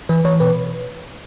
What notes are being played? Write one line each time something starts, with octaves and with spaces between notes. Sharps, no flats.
E3 B4
E3 C#5
B2 B4